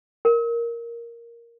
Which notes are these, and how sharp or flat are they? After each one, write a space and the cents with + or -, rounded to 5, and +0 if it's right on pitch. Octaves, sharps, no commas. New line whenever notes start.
A#4 +0